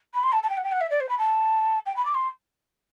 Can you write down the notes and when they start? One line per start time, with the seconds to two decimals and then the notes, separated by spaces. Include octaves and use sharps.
0.13 B5
0.23 C6
0.32 A5
0.43 A5
0.49 G5
0.57 F#5
0.63 G5
0.71 F#5
0.80 E5
0.90 D5
1.00 C5
1.08 B5
1.18 A5
1.85 G5
1.96 B5
2.05 D6
2.14 C6